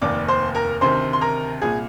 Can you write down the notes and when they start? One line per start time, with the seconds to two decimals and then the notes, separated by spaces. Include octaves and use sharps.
0.02 F1 D#2 D#3 D5 D6
0.28 C5 C6
0.55 A#4 A#5
0.81 D2 C3 D#3 C5 C6
1.13 C6
1.21 A#4 A#5
1.62 C2 A#2 G#4 G#5